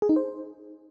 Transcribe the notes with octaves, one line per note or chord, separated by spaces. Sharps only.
G#4
D#4
C5